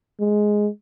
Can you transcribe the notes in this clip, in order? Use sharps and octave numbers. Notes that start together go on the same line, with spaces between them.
G#3